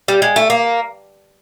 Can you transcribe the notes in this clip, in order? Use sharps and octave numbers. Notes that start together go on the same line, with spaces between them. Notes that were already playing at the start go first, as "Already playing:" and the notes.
G3
G#3
A3
A#3